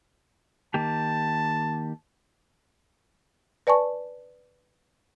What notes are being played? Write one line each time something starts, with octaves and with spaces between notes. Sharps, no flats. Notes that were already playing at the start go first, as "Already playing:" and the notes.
D#3 A#3 G4 A5
B4 D5 G#5 A5 C#6